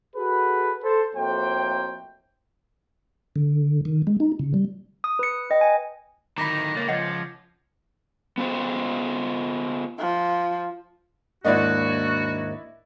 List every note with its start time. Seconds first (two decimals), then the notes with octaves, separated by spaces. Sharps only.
0.16 F#4 G#4 A4 B4
0.83 A4 C5
1.15 F2 A2 A#3 F#4 C5 G5
3.36 D3
3.85 D#3
4.07 G#3
4.20 D#4
4.39 C#3
4.54 G3
5.04 D#6
5.19 B4 C#7
5.50 B4 D#5 G5
5.61 G#5
6.38 D2 A2 D#3 A#5 B5 D6 A#6 B6
6.77 C#2 A#3 C#5 A6 A#6
6.88 F3 C#5 D#5 F#5 G#6 A6 C#7
8.38 B3 F4 C5
9.99 F3
11.45 D#2 G#2 A#3 D4 E4 F#4 D5 D#5